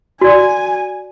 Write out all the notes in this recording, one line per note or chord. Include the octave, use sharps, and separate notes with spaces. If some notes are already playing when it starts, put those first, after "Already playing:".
F#4 D5 G#5